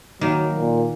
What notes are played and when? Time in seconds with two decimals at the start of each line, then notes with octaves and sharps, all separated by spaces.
0.21 D#3 F#3 A#3
0.56 A#2